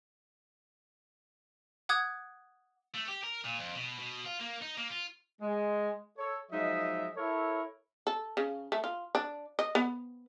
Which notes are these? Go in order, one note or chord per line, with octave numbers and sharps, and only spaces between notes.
F#5 D6 D#6 F#6 G#6
A3
G4
A#4
A#2
F2
B2
B2
F4
A#3
D#4
A#3
F4
G#3
A4 C#5
F3 F#3 G#3 D#4 D#5 E5
E4 A4 A#4 C#5
A4
C#3
A3
F4
D4
D#5
B3